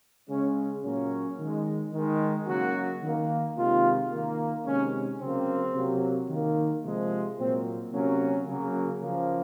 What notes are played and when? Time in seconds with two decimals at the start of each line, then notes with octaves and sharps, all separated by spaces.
0.29 C#3 G#3 C#4
0.83 A#2 F#3 A#3 C#4
1.39 D#3 G#3
1.93 D#3 G#3
2.47 C#3 F#3 A#3 F#4
3.02 D#3 A#3
3.56 C3 D#3 G#3 F4
4.11 D#3 A#3
4.65 C3 D#3 G#3 C#4
5.19 C#3 F#3 A#3 C4
5.74 C3 F#3 A#3
6.28 D#3 A#3
6.84 C3 F3 G#3
7.37 A#2 F#3 A#3 C4
7.92 C3 F#3 A#3 C#4
8.46 C#3 F#3 A#3
9.01 C#3 F3 A#3